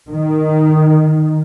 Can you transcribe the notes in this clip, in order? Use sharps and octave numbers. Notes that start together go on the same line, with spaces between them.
D#3